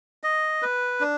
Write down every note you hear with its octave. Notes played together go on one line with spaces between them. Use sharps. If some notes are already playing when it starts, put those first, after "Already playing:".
D#5
B4
D4